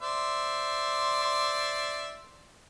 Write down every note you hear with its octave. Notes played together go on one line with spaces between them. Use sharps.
C5 D5 E5